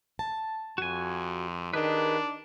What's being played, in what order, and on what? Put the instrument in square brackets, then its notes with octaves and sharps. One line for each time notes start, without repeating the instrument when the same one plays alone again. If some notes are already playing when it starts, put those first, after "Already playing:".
[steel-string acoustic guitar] A5
[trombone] F2 [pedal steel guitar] F#4 G#5
[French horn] D#3 [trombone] D4 [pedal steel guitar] G4 G#4 B4